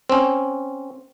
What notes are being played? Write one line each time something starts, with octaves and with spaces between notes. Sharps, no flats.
C4 C#4